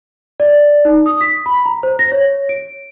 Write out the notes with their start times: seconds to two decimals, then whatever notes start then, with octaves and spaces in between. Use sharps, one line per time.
0.40 D5
0.85 D#4
1.06 D#6
1.21 B6
1.46 B5
1.66 A#5
1.83 C5
1.99 A#6
2.12 C#5
2.49 D7